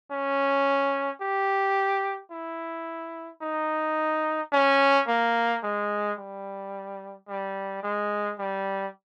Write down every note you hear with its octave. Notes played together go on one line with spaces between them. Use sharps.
C#4
G4
E4
D#4
C#4
A#3
G#3
G3
G3
G#3
G3